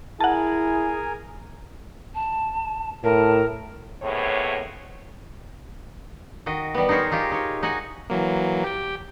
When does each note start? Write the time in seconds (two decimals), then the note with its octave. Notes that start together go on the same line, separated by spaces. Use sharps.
0.21 E4 G#4 A#4 F#5 G#5 A5
2.15 A5
3.04 A2 A#4 A5
4.02 D#2 A2 C3 B3 G#4 C#5
6.46 D#3 F#4 D#5
6.74 G3 B3
6.89 D#4 G#4 A#4 C5 C#5
7.12 D#4 F4 G4 G#4
7.32 D#4 C#5
7.63 D#4 F#4 F#5 G#5
8.10 E3 F#3 A#3
8.64 G4 G5